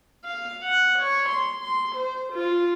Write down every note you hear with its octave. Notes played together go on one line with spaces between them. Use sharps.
F5
F#5
C#5
C6
C6
C5
F4